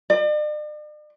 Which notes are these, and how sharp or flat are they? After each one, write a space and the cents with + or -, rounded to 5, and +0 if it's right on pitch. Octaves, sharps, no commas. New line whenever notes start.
D5 +45